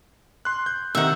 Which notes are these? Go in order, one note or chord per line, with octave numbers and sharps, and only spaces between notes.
C6 F#6
G6
C3 D#3 D#4 E5 F#5